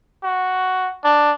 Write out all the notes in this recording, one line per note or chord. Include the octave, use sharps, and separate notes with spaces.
F#4
D4